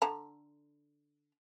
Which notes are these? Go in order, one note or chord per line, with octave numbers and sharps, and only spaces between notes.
D3 A5 A#5